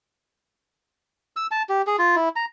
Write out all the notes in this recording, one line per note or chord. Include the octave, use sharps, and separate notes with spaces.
E6
A5
G4
G#4
F4
E4
A#5